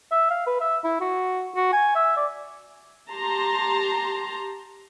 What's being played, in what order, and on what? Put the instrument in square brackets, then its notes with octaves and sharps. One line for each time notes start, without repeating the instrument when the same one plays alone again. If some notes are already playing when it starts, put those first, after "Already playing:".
[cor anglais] E5
F5
B4
E5
E4
F#4
F#4
G#5
E5
D5
[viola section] G4 A5 A#5 C6